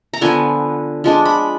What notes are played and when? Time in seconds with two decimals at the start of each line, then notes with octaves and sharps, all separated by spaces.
0.13 A#5
0.21 D3 F3 B3 G#5
1.04 F3 G#3 D4
1.25 B5